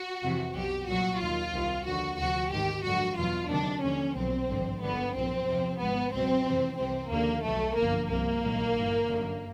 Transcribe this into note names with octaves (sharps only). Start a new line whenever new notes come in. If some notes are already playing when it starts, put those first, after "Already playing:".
Already playing: F#4
F2 C3 E3
B1 B2 F#3 G4
C2 A#2 F#3 F#4
D#2 D#3 F#3 F4
C2 C3 D#3
D#2 D3 F3 F#4
D2 C3 F3 F#4
G#1 G#2 D#3 G4
G#1 F#2 D3 F3 F#4
E2 B2 F#3 F4
D2 C3 D#3 F#3 D4
D#2 D3 F3 C#4
B1 A#2 F#3 C4
G#1 G2 D3 F3
G1 F#2 D3 F3 B3
B1 A#2 F3 C4
E2 C3 F3
G#1 G#2 F3 B3
C#2 B2 F#3 C4
F2 C3 E3
C2 C3 E3 C4
D#2 D3 F3 A#3
B1 B2 F#3 A3
G1 F#2 D3 F3 A#3
C2 C3 F3 A#3
A#1 G#2 D#3 F#3
G1 G2 E3
G1 F#2 D3 F#3